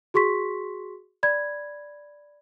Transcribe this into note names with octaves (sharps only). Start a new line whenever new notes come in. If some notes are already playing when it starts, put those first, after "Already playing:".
F#4 G#4 C6 C#6 B6
D5 B5 G#6